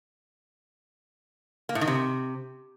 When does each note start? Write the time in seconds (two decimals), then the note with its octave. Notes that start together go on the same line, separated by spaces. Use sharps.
1.69 A#3
1.75 A2
1.81 D#3
1.87 C3